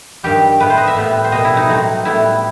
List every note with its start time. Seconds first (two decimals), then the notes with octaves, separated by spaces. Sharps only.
0.23 G2 D#3 G3 G4
0.60 A2 G3 B3 B4
0.70 C5
0.78 D#5
0.87 E5
0.96 A2 G3 B3
1.24 C5
1.32 B2 G3 B3 D#5
1.45 E4
1.57 D#4
1.69 A2 F#3 A3 C4
2.05 A2 G3 B3 E4